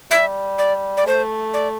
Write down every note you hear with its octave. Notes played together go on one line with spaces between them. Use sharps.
G3 E5
D5
D5
A3 C5
D5